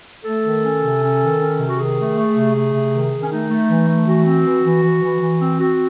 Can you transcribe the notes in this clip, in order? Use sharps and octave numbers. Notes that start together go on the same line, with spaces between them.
A3 A4
D#3
C#4
C3
C#4
D#3
C#4
C3
F#4
D#3 G#4
A3
A3
C3
A3
C3
D#3
D#3
C#4
A3 D#4
A3
E3
A3
E3 F#4
C4
E3
E3
E3
E3
E3
C4
C4 F#4